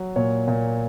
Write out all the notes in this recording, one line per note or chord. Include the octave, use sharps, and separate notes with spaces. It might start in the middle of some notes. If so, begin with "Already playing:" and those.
Already playing: F#3
A#2 C#5
A#2